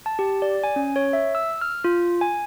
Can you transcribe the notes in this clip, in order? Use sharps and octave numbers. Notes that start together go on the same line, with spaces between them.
A5
G4
D5
G#5
C#4
C#5
E5
E6
F6
F4
G#5